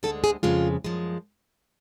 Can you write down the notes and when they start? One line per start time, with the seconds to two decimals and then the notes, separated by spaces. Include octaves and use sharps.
0.03 D2 D3 G#3 A4
0.24 G#4
0.43 F2 C#3 G#3 F4
0.84 F#2 F3 G#3